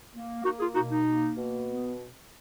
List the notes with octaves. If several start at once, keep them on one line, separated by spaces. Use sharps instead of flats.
A#3
A#3 D#4 F#4
F4 G#4
B2 D#4 F#4
D#4
A#3
B2
B3